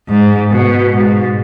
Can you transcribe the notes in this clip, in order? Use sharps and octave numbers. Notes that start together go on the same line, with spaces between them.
G#2
B2
G#2